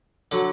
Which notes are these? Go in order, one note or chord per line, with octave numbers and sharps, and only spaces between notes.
D3 F#3